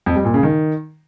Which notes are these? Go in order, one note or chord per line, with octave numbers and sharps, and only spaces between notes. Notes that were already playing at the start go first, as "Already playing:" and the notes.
F2
G3
A#2
C#3
D#3